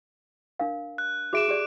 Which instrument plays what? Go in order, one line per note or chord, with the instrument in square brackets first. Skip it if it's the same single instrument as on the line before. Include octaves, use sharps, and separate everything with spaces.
[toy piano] D4 A#4 F5
[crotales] F#6
[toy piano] F#4 G#4 E5 [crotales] D6 D7 E7
[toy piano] G4 G#4 D5